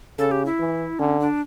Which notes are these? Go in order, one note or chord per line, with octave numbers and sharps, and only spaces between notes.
C#3 A4
G4
E4
E3
D3 C#4
D4